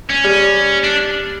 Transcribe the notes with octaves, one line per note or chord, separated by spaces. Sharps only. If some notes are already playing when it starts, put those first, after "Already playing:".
C#4
G3
D4